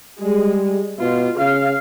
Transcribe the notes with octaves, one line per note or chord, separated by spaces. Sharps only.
G3 G#3
B2 F4
C#3 F5